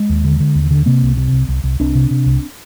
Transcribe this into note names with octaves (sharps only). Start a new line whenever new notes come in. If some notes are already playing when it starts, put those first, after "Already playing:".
Already playing: G#3
D#2
D3
D3
D#2
D3
C3 A#3 C4
C2
C3
C2
C2
C2
C2 C4 D4
C3
C3
C2